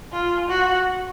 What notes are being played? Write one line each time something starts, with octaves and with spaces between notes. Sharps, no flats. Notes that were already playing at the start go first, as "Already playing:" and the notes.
F4
F#4